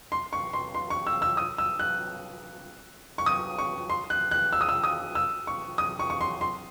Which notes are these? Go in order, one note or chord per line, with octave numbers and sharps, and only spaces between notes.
C6
C#6
C6
C6
C#6
E6
E6
D#6
E6
F#6
C#6
D#6
C#6
C6
F#6
F#6
E6
D#6
E6
D#6
E6
C#6
D#6
C#6
C#6
C6
C6